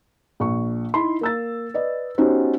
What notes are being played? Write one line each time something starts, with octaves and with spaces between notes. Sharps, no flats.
A#1 C#6
D#4 E4 B5 C6
A#3 E6 A6
B4 D5 D#5
B3 C#4 D#4 F#4 G4 C5